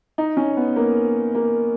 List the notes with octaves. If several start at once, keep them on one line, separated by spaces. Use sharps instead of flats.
D#4
C#4
B3
A#3
A#3